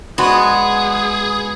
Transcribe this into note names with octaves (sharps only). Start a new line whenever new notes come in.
G#3 B3 F#4 G#4 D5